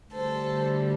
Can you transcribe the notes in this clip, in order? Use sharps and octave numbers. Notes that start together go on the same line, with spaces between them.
D2 D3 G3 A4 C5